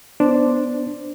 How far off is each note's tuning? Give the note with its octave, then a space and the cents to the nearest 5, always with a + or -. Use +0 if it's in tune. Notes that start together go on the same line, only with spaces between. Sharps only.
B3 +0 D4 +0 C5 +0